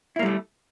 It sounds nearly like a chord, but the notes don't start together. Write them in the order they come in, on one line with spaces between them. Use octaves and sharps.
E4 A#3 G3 A3